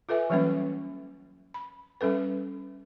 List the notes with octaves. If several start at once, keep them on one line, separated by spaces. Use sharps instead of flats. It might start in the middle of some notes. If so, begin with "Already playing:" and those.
F4 A4 B4 E5 G#5
E3 F#3 G3 A#3 C#4 B4
B5
G3 C#4 A4 B4